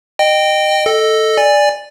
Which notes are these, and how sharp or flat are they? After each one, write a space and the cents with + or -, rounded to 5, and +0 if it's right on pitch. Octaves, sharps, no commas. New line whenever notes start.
D#5 -20 G5 +0
A4 +0 D#5 +0
D5 +0 G#5 -15